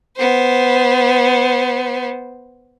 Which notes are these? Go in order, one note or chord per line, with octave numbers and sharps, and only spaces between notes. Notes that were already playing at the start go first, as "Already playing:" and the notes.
B3 C5